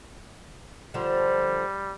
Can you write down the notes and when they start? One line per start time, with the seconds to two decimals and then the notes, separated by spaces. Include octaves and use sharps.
0.94 D3 F3 G3